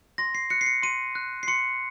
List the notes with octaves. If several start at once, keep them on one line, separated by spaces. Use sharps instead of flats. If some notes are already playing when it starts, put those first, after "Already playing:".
C6 A#6
C7
F#6 C#7
C7
C#7
C6 D#7
F#6
C7
C6 C#7